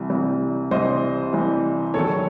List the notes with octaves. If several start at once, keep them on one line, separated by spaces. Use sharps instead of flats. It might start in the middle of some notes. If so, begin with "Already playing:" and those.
Already playing: C2 C3 E3
C2 C3 E3
C2 C3 E3 C5 D#5
C2 C3 E3
E1 E2 D#3 F#3 A4 C#5